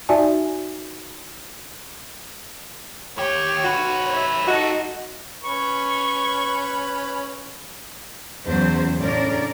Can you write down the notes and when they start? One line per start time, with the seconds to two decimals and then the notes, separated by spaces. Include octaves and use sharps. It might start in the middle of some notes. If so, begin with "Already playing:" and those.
0.09 D#4 F#4 D5 E5 G#5 A5
3.18 D#2 G4 C#5
3.64 D#4 F#4 B4
4.09 C#5 E5
4.47 D#4 E4 F#4 A4 D#5
5.43 C#4 B4 C#6
8.47 E2 C#3 F#3 C5
8.99 A2 C#3 C#4 D4 A#4 D5